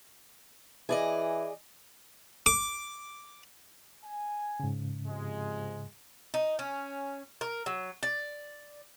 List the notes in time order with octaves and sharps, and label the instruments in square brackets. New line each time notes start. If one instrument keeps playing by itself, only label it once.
[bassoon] E3 [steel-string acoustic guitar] G#4 D5 D#5
[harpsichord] D6
[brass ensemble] G#5
[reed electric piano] G#2 C#3
[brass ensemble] C3 F3 G#3
[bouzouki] D#4
C#4
A#4
F#3
D5